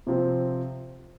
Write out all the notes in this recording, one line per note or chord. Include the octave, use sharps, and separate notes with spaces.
C3 F3 C4